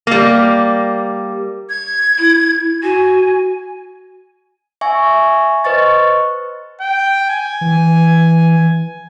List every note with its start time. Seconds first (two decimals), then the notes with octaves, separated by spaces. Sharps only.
0.07 G3 A#3
1.70 G#6
2.19 E4
2.83 F#4 G#5
4.81 E5 G#5 C#6
5.64 B4 C5 D#5 C#6 A6
6.81 G5
7.30 G#5
7.61 E3